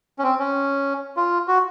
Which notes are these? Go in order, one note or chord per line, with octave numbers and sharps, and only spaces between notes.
C#4
C4
C#4
F4
F#4